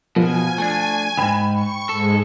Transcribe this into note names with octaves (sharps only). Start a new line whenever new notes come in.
B2 F3 G#5
A3 D4
D2 G#2 G5 B5 E7
C#6
G#2 G#3 A4